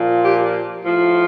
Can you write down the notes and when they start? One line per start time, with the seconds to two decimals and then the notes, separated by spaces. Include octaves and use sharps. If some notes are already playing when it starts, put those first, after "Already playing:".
Already playing: A#2 F3
0.23 G4
0.83 A2 F3